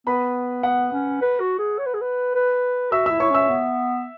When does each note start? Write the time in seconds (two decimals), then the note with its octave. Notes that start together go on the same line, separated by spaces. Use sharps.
0.07 B3 B4 B5
0.63 B3 F#5
0.92 C#4
1.21 B4
1.40 F#4
1.59 G#4
1.78 C#5
1.86 B4
1.94 G#4
2.01 B4
2.35 B4
2.92 F#4 E5 E6
3.06 E4 E5 E6
3.20 E4 C#5 C#6
3.30 C#4 E5 E6
3.49 B3